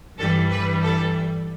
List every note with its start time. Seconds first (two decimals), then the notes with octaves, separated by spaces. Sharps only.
0.18 G2 E3 G3 A4
0.50 B4
0.82 A4